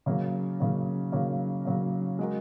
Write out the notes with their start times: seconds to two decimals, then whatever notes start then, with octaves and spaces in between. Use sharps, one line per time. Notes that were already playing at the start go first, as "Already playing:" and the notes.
0.06 C#3 F#3 A#3
0.60 C#3 F#3 A#3
1.12 C#3 F#3 A#3
1.65 C#3 F#3 A#3
2.19 G#3 F#4 A#4